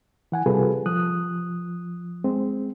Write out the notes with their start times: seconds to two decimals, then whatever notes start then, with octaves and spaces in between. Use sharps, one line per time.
0.32 E3 F#5 G#5
0.46 C3 G3 F4 G#4 A4 B4
0.86 F3 D#6 F#6
2.24 G#3 C4